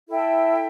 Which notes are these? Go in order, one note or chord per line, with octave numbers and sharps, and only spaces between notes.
E4 A4 E5 G5